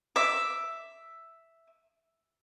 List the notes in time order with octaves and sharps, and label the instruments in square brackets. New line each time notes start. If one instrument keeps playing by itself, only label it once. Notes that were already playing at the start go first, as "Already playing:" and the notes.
[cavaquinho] E5 D6